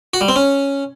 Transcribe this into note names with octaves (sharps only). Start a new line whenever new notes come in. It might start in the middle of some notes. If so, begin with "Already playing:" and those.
F#4
G3
C4
C#4